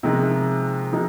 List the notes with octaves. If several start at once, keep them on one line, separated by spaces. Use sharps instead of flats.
C3 F3 G#3 D#4 A#4
C3 F3 G#3 D#4 A#4